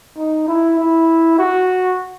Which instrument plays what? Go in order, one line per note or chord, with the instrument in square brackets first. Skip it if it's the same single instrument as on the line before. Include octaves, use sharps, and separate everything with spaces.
[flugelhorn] D#4
E4
E4
F#4